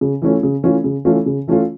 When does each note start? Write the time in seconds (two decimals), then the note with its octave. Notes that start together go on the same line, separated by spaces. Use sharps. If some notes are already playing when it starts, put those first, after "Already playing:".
0.01 C#3
0.22 E3 A3 C#4 F4
0.43 C#3
0.63 E3 A3 C#4 F4
0.84 C#3
1.05 E3 A3 C#4 F4
1.26 C#3
1.47 E3 A3 C#4 F4